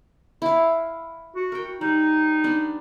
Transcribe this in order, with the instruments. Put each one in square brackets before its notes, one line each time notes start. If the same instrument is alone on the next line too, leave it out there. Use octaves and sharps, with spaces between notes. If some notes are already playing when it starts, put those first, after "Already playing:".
[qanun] E4 F5
[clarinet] F#4
[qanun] A#4 G5
[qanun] G3 [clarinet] D#4
[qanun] B3 D4